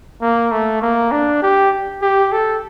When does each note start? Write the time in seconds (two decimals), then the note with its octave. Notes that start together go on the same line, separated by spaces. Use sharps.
0.22 A#3
0.52 A3
0.82 A#3
1.12 D4
1.43 G4
2.02 G4
2.32 A4